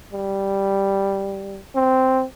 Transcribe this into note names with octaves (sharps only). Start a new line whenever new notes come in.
G3
C4